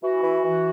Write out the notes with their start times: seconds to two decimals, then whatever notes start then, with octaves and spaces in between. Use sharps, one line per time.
0.03 E3 F#4
0.23 E3
0.45 E3